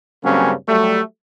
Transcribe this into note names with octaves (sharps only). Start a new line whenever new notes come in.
G2 C#3 F#3 A#3 C4 C#4
F#3 G3 A3